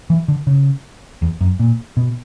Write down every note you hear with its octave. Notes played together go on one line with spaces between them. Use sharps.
E3
D3
C#3
E2
F#2
A#2
B2